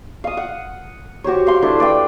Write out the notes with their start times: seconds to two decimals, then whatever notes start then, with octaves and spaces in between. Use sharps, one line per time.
0.24 F5 D#6
0.37 F#5
1.24 F#4 G4 C5 C#5
1.47 F5 C6
1.62 A3 D4 E4
1.79 B4 D5 F5 G5